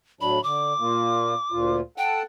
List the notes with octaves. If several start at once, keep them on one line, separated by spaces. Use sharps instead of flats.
A2 F#3 D4 B5
D3 D6
A#2 A#3 F4
D2 A#2 F4
A4 F#5 G5 A5